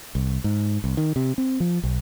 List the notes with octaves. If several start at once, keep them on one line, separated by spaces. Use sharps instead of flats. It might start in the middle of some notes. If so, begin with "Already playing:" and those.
C2
G#2
C2
D#3
C3
C4
F3
B1